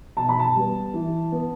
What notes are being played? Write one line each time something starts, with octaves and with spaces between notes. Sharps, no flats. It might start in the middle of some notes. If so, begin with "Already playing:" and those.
B2 A5
B5
A5
G3 B3
E3
B3